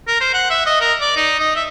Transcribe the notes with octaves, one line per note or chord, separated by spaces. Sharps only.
A#4
C5
F#5
E5
D#5
A#4
D5
D#4
D#5
E5